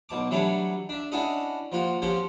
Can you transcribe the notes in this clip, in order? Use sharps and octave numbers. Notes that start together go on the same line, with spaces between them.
B1 B2 A5 D6
E3 F#3 G3 A3 D4 C#5
D4 E5
C#4 D4 E4 F#4 A4 D#5
F3 A#3 F4 F#4
F3 C4 C#4 F#4 G4 C5